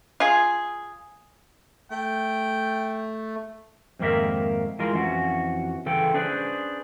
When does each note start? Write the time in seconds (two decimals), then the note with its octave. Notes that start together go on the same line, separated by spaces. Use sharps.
0.20 F4 G#4
1.91 A3 G5
3.99 F2 G#2 D#3 A#3 A#4 E5
4.79 E3 G#3 F4 A#4
4.94 F2 E3 C#4 F#4
5.86 C#3 E3 A4 G5
6.14 C#4 D4 G#4 B4 C5